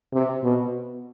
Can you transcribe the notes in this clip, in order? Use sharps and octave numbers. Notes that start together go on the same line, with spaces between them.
C3
B2